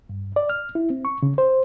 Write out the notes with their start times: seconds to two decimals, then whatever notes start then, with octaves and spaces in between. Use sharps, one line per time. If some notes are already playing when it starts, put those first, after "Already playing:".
0.09 G2
0.36 D5
0.50 F6
0.75 E4
0.90 C4
1.05 C#6
1.23 C#3
1.38 C5